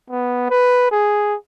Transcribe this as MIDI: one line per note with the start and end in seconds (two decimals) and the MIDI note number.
0.10 0.47 59
0.50 0.91 71
0.91 1.35 68